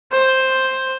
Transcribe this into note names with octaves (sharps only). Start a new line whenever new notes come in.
C5